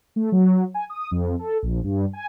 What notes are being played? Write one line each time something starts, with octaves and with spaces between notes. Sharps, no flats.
A3
F#3
G#5
D#6
F2
A4
A#1
G2
G#5